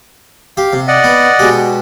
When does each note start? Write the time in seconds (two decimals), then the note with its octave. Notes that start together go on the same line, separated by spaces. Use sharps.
0.57 G4 F5
0.73 C3
0.88 D5 D#5 F#5
1.04 B3
1.39 B2 G#3 G4